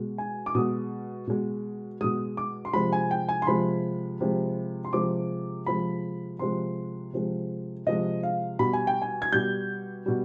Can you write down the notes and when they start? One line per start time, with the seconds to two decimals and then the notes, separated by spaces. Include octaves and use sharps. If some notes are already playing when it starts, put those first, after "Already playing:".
Already playing: B2 G#3
0.18 G#5
0.46 D6
0.55 B2 G#3 D#6
1.27 B2 G#3
2.01 B2 G#3 D#6
2.37 D6
2.65 C6
2.73 C3 F3 G#3 B5
2.93 G#5
3.11 G5
3.29 G#5
3.42 C6
3.47 C3 F3 G#3 B5
4.21 C3 F3 G#3
4.85 C6
4.93 C3 F3 G#3 D6
5.66 C3 F3 G#3 B5
6.39 C3 F3 G#3 C6
7.13 C3 F3 G#3
7.87 C3 F3 G#3 D#5
8.23 F5
8.59 B2 G3 B5
8.73 G#5
8.87 G5
9.02 G#5
9.22 G#6
9.32 B2 G3 G6
10.06 B2 G3